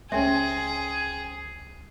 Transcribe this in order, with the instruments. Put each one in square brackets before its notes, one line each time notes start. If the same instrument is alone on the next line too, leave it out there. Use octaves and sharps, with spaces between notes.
[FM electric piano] C#2 G3 [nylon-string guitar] C4 C#4 [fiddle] G#4 [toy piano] E5 G#5